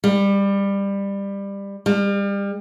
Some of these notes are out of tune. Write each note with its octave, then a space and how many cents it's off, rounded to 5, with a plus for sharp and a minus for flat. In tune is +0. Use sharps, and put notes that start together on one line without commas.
G3 +20
G3 +35